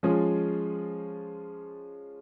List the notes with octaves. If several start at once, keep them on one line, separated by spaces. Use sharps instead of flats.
F3 G#3 C#4 F4 G#4